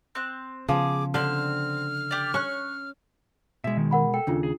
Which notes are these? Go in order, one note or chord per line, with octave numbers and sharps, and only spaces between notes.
C4 F#6
C#3 F3 B3 G#4 D6
D3 C4 F6
G4 D5
C#4 C#6 F#6
B2 G#3 E5
D#3
A#4 F#5 B5
A4 G5
D#2 C#3 D4 F4
G#4